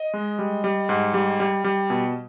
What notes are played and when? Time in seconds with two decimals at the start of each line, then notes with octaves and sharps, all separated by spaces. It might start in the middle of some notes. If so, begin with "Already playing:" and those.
Already playing: D#5
0.14 G#3
0.39 G3
0.64 G3
0.89 G#2
1.14 G3
1.40 G3
1.64 G3
1.90 B2